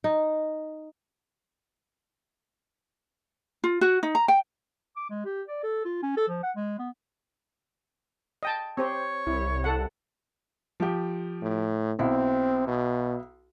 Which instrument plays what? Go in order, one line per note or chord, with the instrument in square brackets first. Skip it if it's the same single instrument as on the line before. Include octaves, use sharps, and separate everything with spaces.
[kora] D#4
[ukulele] F4
F#4
D#4
A#5
G5
[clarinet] D6
G#3
G4
D5
A4
F4
C#4
A4
F3
F#5
G#3
B3
[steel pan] D#5 G5 A5
[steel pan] C4 G4 C5 [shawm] C#5
[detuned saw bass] C2 [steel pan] E4
[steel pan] A4 F#5
[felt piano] F3 G4
[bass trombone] A2
[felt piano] B1 E4 [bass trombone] C4
[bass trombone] B2